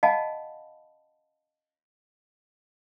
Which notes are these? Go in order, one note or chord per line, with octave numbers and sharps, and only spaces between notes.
D#5 F5 F#5 G#5 A5 B5